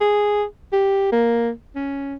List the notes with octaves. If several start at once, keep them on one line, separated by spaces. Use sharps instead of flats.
G#4
G4
A#3
C#4